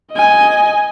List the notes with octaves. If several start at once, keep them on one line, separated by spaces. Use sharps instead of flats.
D#5 G#5